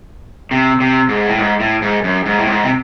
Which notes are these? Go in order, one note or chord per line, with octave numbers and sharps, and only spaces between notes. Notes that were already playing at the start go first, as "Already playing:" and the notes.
C3
C3
G#2
A2
G#2
A2
G#2
F#2
G#2
A2
G#2
C3